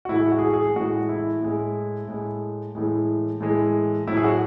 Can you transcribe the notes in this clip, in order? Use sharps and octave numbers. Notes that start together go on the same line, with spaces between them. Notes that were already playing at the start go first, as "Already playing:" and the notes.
F#4
A2 E3 G#3 E4
F#4
G#4
F#4
G#4
A2 E3 G#3 F#4
E4
A2 G#3
A2 G#3
A2 E3 G#3
A2 E3 G#3
A2 F#3 E4
G#4
F#4